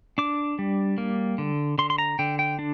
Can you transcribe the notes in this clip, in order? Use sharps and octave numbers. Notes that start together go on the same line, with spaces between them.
D4 D6
G3
A#3
D3
D3 C6
C6
A#5
D3 G5
G5
D4